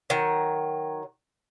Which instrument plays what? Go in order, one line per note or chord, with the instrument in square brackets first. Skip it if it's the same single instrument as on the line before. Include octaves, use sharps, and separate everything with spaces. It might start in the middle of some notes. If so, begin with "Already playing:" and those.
[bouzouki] D#3 F#3